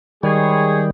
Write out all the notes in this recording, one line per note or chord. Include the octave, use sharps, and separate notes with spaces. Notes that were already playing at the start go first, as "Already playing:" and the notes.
D#3 G3 G#3 G#4 C#5